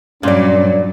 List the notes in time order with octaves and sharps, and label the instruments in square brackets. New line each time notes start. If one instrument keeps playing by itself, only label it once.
[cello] G2 F#3 [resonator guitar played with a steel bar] A#2 D5 [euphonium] C#4